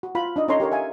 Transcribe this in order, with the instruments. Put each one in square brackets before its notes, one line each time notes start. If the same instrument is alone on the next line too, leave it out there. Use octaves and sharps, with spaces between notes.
[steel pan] F#4
F4 B5
D4 D#4 D#5
C#4 D#4 A4 C#5 A#5 C6
G4 A#4 C#5
E5 F5 G#5